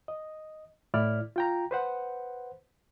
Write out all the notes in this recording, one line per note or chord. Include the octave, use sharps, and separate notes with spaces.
D#5
A2 E4 D5 F6
F4 G5 A#5
B4 C5 F#5